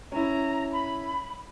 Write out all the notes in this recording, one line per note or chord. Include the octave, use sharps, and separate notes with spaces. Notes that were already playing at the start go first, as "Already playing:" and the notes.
C#4 E4 A#5
B5